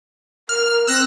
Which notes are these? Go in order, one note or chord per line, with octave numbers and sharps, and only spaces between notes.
A#4 F6
C4 E6 F#6 A#6